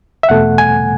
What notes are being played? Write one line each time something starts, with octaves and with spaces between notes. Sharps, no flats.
E5
E2 B2 A3 F#5
G#5